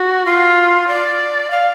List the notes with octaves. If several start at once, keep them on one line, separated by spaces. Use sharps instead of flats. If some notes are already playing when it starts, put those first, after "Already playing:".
Already playing: F#4
F4
D5
F5